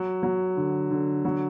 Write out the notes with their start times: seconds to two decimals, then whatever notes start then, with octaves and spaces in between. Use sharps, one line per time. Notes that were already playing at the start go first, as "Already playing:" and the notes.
Already playing: F#3
0.23 F#3
0.57 D3
0.91 D3
1.25 F#3